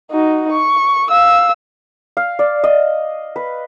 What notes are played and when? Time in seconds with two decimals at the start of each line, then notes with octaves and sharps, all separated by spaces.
0.11 D#4 F#4
0.51 C#6
1.09 F5 E6
2.17 F5
2.39 D5
2.64 D#5
3.36 B4